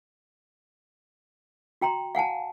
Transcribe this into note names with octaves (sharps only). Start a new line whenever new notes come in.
F#4 G5 A#5 C6
F5 F#5 G#5 A5